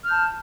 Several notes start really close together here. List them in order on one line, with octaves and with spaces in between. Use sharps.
F6 G6 A5